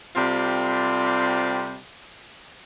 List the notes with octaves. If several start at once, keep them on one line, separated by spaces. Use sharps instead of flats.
C3 G3 C4 F4 A4 D5